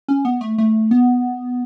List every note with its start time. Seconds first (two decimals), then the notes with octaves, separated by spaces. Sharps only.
0.08 C#4
0.25 B3
0.41 A3
0.58 A3
0.91 B3